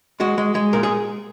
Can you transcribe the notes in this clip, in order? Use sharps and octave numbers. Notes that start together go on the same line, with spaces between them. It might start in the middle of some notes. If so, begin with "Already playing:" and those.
G#3 F#4
G#3
G#3
A#2 A#4
G#4